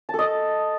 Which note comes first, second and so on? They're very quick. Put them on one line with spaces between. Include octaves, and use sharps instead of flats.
A5 A4 D#5